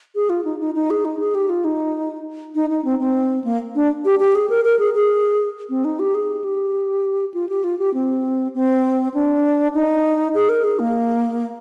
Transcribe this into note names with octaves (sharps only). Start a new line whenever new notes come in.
G#4
F4
D#4
D#4
D#4
G#4
D#4
G#4
G4
F4
D#4
D#4
D#4
C4
C4
A#3
D4
G4
G4
G#4
A#4
A#4
G#4
G#4
C4
D#4
G4
G#4
G4
F4
G4
F4
G4
C4
C4
D4
D#4
G#4
A#4
G#4
A#3